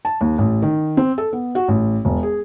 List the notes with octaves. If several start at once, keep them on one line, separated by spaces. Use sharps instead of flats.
A5
D#2
A1
D#3
C4
A4
B3
F#4
A1
E1
G#4